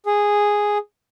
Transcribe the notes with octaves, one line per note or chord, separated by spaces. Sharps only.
G#4